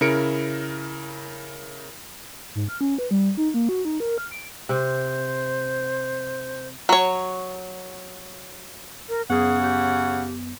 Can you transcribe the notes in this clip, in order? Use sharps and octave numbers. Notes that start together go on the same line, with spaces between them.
C#3 E4 A#4 C#7 D7
G#2
F6
C#4
B4
G3
D#4
A#3
F#4
D#4
A#4
F6
D7
C3 C5
F#3 C#5
A#4
F#2 C#3 B3 G#4 C#5 F#5
G4